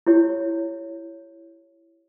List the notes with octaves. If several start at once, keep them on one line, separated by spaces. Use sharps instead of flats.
E4 G4 C#5